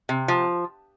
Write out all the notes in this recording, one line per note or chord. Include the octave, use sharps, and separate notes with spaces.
C3
F3